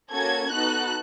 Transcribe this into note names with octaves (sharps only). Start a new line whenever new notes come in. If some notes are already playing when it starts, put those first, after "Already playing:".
A#3 C#4 F#4 A4 G#6
B3 D#4 F#4 A4 F#6